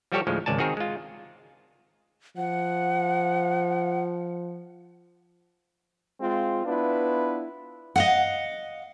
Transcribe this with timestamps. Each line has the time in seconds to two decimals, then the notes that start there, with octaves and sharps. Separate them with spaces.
0.12 F3 G3 F#4 G4 A4 C#5
0.27 D2 A2 F3 G#3
0.46 G#1 C#2 D5 G#5 A5
0.58 D#3 C4 F#4 G#4 A#4
0.77 G#3 F4
2.37 F3 F#5
6.21 G#3 C4 F4
6.66 B3 D4 E4 F4 B4
7.96 D#5 F5 F#5